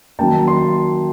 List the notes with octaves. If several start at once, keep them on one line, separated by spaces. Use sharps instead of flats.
D#3 F#3 A#3 C#4 G5 A5
C6